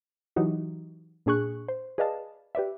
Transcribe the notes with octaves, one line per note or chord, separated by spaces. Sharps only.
E3 F#3 D#4 F#4 G4
A#2 D4 G#4 C#6 F#6
C5
G#4 B4 D5 D#5 F5 A5
G4 B4 D5 E5